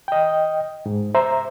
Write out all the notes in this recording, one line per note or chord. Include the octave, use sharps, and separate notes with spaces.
D#5 G5
G#2
C5 E5 A#5